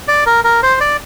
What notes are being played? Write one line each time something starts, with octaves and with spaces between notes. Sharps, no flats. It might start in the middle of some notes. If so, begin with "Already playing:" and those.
D5
A#4
A#4
C5
D5